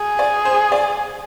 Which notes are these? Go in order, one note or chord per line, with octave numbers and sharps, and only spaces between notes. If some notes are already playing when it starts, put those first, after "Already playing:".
Already playing: G#4
D5
C5
D5